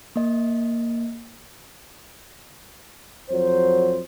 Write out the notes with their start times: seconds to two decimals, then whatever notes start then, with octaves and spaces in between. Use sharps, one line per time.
0.16 A#3 D#5
3.31 F2 F#3 C5